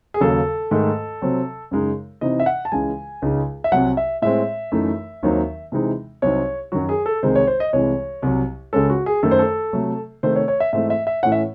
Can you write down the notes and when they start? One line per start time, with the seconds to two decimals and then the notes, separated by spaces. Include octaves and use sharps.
0.14 G#4
0.21 D#2 C#3 F#3 A4
0.71 G#2 D#3 A3
1.22 C3 F#3 C4
1.71 F#2 C#3 G#3 D#4
2.21 C3 E3 C4 D#4 D#5
2.40 E5
2.46 F#5
2.65 A5
2.72 C#2 C#3 E3 G#3 G#5
3.22 C#2 C#3 G#3 D#4
3.64 E5
3.72 C2 C3 F#3 F#5
3.97 E5
4.22 A2 G#3 C4 E5
4.72 F#2 E3 A3 D#4
5.23 D#2 D#3 F#3 C4 D#4
5.72 C3 E3 G#3 C4 D#4
6.22 C2 C3 F#3 C4 D#4 C#5
6.72 F#2 D#3 F#3 F#4
6.89 G#4
7.06 A4
7.22 C2 C3 D#3 G#3 D#4 C5
7.35 C#5
7.47 C5
7.60 D#5
7.73 C2 C3 E3 G#3 C#5
8.22 C2 C3 F#3
8.73 C#2 C#3 G#3 C#4 A4
8.90 F#4
9.06 G#4
9.23 F#2 D#3 A3 A4
9.31 C5
9.39 A4
9.73 C3 F#3 A3
10.23 C3 D#3 A3 C5
10.36 C#5
10.48 C#5
10.60 E5
10.73 G#2 E3 A3 C4 E5
10.90 E5
11.07 E5
11.23 A2 E3 A3 C#4 F#5
11.32 E5